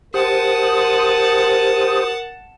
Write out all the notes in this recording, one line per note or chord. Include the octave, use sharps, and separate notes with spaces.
G4 A#4 C5 F#5 A5 D#6